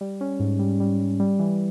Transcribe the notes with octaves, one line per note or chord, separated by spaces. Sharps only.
G3
C#4
G#2
G3
G3
G3
G3
E3